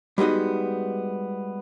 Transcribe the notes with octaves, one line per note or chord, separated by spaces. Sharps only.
G3 G#3 B3 D#4 F#4